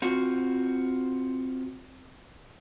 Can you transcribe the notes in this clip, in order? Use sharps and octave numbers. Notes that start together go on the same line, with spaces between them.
C4 F4 F#4